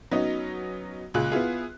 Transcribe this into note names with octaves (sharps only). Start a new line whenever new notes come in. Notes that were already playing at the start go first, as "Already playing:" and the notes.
F#3 B3 C#4 D#4
C#2 A#2 G#4 F#6
B3 E4 F4 G#4